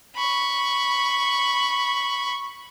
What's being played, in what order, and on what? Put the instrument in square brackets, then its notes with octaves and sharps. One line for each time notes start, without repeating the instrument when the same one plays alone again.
[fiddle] B5 C#6